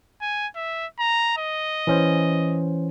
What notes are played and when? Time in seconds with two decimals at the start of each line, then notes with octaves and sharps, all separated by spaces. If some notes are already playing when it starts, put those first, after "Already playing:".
0.21 G#5
0.56 E5
0.99 A#5
1.37 D#5
1.87 E3 C#4 C5